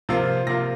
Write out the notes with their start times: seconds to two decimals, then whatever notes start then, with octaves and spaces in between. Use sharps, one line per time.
0.09 C3 F3 A#3 F4
0.47 C3 F3 A#3 F4 A#6